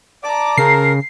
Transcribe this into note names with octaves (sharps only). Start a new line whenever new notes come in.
D5 A5 A#5 D6
C#3 A#4 C7